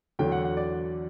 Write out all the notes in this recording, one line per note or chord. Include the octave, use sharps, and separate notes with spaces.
E2 D3 F#3 A3 G5
F#5
F#5
D5